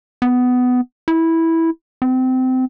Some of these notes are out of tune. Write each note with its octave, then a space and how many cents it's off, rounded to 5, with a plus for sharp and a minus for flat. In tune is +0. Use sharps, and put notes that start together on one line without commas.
B3 +15
E4 -10
C4 -25